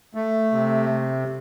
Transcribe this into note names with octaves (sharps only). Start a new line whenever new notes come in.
A3
C3